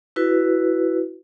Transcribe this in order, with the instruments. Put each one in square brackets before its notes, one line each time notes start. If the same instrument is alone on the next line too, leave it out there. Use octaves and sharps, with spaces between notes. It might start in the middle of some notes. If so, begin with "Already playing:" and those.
[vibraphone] E4 F#4 B4